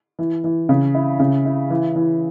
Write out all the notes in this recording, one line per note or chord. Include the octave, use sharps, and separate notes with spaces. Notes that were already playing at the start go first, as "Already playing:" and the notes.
E3
E3
C#3
E4
C#3
E4
E3
E3